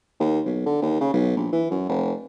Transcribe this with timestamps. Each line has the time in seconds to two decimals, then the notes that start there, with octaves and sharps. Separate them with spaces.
0.20 D#2
0.46 B1
0.66 D3
0.82 D#2
1.01 C#3
1.14 B1
1.36 A#1
1.52 E3
1.70 F#2
1.88 F1